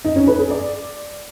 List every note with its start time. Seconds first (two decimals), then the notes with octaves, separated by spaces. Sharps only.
0.05 D#4
0.16 C#4
0.27 B4
0.39 G#4
0.50 D5